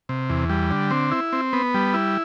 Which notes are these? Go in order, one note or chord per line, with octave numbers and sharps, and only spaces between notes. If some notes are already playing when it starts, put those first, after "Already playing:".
C3
E2
G3
D3
C4
E4
C4
B3
G3
E4